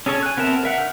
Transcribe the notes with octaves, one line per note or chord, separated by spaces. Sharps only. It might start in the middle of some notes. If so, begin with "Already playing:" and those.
C#4 G#4 A4 C#5
G#5 F#6
B3 C4 A#4 E5 A5
A#4 E5 F#5
D3 F6 G6